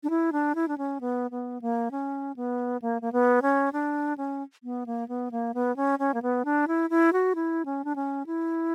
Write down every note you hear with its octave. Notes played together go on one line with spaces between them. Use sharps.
D4
E4
D4
E4
D4
C#4
B3
B3
A#3
C#4
B3
A#3
A#3
B3
C#4
D4
C#4
B3
A#3
B3
A#3
B3
C#4
C#4
A#3
B3
D4
E4
E4
F#4
E4
C#4
D4
C#4
E4